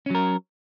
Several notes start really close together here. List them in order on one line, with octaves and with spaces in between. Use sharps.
C#4 F#3 A#4